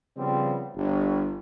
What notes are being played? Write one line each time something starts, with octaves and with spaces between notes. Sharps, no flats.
C#3 F3 G3 B3 C4
G1